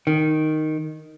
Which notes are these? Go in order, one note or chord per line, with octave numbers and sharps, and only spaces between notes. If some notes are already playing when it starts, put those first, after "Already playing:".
D#3